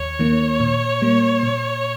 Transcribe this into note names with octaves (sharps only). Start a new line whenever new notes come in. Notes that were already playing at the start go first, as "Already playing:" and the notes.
Already playing: D#2 C#5
D#3 A#3
A#2
G3 A#3
A#2